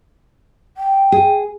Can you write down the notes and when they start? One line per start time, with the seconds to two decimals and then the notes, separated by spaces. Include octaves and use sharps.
0.77 G5
1.12 G#4